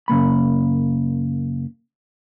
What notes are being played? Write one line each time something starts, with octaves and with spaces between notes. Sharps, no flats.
F#2 C#3 A#3 B5